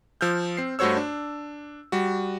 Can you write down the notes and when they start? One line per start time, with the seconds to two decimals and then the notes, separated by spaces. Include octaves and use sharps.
0.21 F3 E6 F6 G6
0.57 C4 C7
0.79 G2 A3 F#4 C5 C#5 E6
0.97 D4
1.92 G3 F#4